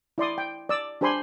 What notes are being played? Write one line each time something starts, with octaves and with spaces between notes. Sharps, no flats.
E4 D5 C6 D#6
G5
D5 E6
D4 G4 C5 G#5 B5 C6